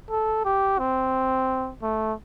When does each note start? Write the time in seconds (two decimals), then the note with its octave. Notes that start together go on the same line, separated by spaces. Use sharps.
0.10 A4
0.45 G4
0.79 C4
1.82 A3